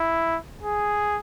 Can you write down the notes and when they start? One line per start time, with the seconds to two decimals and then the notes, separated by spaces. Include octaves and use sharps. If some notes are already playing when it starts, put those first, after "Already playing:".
Already playing: E4
0.62 G#4